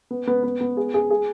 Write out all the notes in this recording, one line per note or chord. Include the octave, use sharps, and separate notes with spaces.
B3
B3
B3
B3
G#4
G#4
G#4